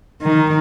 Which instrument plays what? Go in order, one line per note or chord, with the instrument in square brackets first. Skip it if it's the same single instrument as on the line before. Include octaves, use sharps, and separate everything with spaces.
[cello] D#3